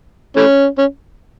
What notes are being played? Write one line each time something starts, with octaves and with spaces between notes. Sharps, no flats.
E3 A3 C#4
C#4